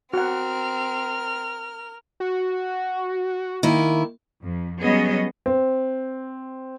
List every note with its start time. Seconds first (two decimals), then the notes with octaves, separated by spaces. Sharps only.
0.13 C4 F#4 A#4 F#5 F6
2.20 F#4
3.63 D#3 A#3 E4
4.43 F2
4.83 F#3 G3 B3 C#4 G#4 D#5
5.46 C4